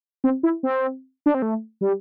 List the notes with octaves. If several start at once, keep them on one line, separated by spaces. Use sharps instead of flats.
C4
E4
C4
D4
C4
A3
G3